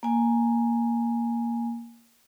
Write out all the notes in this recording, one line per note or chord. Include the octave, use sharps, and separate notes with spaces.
A#3 G#5